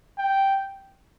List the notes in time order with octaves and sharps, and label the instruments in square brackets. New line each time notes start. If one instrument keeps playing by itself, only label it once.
[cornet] G5